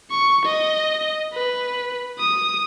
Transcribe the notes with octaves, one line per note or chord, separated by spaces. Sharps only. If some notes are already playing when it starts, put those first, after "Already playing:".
C#6
D#5
B4
D#6